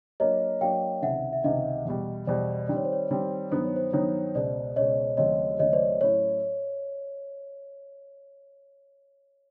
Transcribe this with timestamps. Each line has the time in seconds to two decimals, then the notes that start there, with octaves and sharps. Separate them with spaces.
0.20 F#3 A#3 D4 F#4 A#4 C#5 D#5
0.61 F#3 A#3 D4 F#4 A#4 F5 G5
1.02 C#2 C3 D#3 E5 F#5
1.33 E5
1.44 C#2 C3 D#3 D#5 F5
1.85 E2 B2 G3
2.27 E2 B2 G3 C5 D5
2.68 D#3 G3 C4 D5
2.77 C#5
2.85 C5
2.93 C#5
3.10 D#3 G3 C4 C#5
3.51 G2 D#3 F#3 B3 D#4 C5
3.64 C#5
3.76 C5
3.93 G2 D#3 F#3 B3 D#4 C#5
4.35 C#2 B2 G#3 C5 D5
4.76 C#2 B2 G#3 C#5 D#5
5.17 D#2 C#3 F#3 A3 C4 C#5 D#5
5.59 D#2 C#3 F#3 A3 C4 C#5 D#5
5.73 C5 D5
6.00 A2 F#3 A3 C#4 E4 C#5